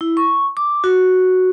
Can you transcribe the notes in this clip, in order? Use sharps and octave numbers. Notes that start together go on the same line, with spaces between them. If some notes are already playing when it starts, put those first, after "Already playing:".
E4
C#6
D6
F#4